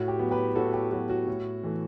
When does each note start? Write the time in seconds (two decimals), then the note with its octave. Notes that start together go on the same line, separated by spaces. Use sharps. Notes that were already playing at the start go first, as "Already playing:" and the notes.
Already playing: A2 F#4
0.08 G4
0.19 F#3 B3
0.31 G4 B4
0.55 A2 F#4 A4
0.74 G4
0.92 F#3 B3 F#4
1.09 F#4
1.27 A2
1.63 E3 A3